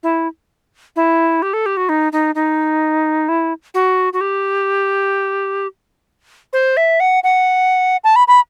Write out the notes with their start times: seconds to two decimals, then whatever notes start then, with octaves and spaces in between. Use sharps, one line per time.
0.03 E4
0.96 E4
1.42 G4
1.53 A4
1.66 G4
1.77 F#4
1.89 D#4
2.12 D#4
2.35 D#4
3.29 E4
3.74 F#4
4.13 F#4
4.21 G4
6.53 C5
6.77 E5
7.00 F#5
7.24 F#5
8.04 A5
8.16 B5
8.28 B5